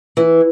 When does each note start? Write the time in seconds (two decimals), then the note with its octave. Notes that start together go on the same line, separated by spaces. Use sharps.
0.17 E3